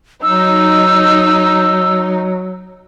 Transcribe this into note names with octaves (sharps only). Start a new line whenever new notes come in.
F#3 D#4 E6